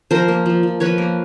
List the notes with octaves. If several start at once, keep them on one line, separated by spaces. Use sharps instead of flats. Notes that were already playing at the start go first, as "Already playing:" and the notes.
F3 A#4 C5
A#3
F3
F3
F3 B4 C#5
A#3